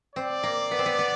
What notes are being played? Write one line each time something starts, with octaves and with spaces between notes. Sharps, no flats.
C4 D5
A#3
B3
C4
B3
B3